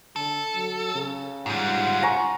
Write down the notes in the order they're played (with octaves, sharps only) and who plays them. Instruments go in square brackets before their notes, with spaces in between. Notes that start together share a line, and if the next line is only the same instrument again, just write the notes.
[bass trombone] D3 [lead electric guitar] A4
[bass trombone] F#3
C#3
[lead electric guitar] G#2 G3 [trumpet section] F4 F#5
[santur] G#5 A#5 C#6